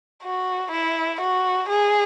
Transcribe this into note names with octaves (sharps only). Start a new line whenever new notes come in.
F#4
E4
F#4
G#4